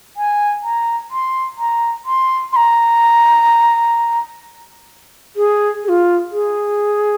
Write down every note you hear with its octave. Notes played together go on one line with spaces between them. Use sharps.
G#5
A#5
C6
A#5
C6
C6
A#5
G#4
G#4
F4
G#4